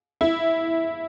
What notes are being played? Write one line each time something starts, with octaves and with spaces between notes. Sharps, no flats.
E4